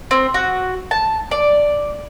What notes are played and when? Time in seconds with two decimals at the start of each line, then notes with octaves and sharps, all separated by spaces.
0.11 C4
0.34 F#4
0.91 A5
1.31 D5